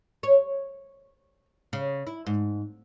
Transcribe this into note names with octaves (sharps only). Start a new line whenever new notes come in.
C#5
C#3
E4
G#2